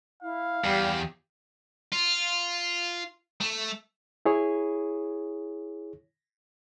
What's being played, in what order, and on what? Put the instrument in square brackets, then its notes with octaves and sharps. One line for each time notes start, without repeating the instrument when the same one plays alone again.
[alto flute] E4 [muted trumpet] F5
[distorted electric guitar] E2 [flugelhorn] G3 [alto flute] G4
[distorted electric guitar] F4
A3
[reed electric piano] E4 G#4 C#5